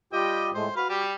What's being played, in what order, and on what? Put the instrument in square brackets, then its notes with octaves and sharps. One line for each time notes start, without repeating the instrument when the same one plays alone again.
[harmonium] G3 F4 G4 [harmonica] D#5 G5
[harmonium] A2 G#3 A3 [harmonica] C5
[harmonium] F#4 [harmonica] B4 F5
[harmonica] G3 G4